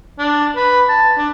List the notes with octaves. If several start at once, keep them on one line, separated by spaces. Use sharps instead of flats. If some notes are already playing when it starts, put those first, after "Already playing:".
D4
B4
A5
D4